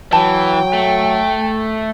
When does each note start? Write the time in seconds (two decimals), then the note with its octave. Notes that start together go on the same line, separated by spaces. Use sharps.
0.13 E3 F#3 G5 A5
0.73 A3